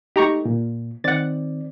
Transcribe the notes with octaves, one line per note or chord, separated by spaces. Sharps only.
A3 D#4 G4 A#5 C#6
A#2
D#3 C4 D5 F#5 A6